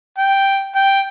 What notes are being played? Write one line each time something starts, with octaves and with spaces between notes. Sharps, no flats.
G5
G5